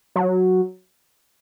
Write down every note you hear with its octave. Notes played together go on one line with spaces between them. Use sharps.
F#3